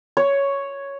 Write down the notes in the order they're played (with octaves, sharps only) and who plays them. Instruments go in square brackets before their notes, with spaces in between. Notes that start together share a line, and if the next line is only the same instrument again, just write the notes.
[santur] C#5